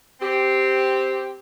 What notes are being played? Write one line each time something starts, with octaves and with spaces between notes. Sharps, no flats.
C4 G4